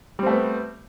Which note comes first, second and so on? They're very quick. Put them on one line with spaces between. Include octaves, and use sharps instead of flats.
G3 C4 A3 B3